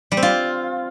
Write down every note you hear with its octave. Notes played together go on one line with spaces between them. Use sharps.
G3
C4
F4